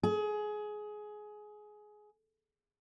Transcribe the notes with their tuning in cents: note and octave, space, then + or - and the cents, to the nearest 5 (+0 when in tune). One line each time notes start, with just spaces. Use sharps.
G#4 +20